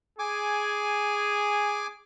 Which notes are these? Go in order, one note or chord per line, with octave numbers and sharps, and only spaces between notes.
G#4 G#5 D6